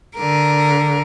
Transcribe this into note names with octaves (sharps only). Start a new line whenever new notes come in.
D3 A#4